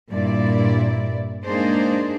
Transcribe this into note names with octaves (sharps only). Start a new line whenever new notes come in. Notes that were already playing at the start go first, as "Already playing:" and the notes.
G2 A#2 E4 D5
G#3 A#3 D4 D#4 G#4 C5